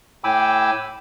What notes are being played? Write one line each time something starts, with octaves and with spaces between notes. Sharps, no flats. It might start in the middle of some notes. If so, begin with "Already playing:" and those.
A2 G5 G#5 B5 D6 E6